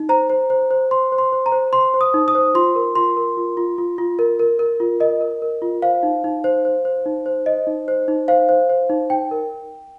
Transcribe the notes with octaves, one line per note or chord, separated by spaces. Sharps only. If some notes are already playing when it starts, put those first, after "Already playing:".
Already playing: D#4
C5 A#5
C5
C5
C5
C5 C6
C5
C6
C5
A#5
C5
C5 C6
C5
D#6
D#4
D#6
C5
F4 C6
A#4
F4 C6
A#4
F4
F4
F4
F4
A#4
A#4
A#4
F4
A#4 D#5
A#4
A#4
F4
C5 F5
D#4
D#4
C5
C5
C5
D#4
C5
C5 D#5
D#4
C5
D#4
C5 F5
C5
C5
D#4
D#4 G5
A#4